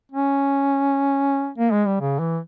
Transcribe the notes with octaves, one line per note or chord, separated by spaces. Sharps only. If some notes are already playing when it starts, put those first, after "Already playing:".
C#4
A#3
G#3
G3
C#3
E3